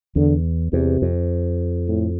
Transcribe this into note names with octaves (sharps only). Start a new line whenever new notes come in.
E2 D3
E2 C3
F2
A2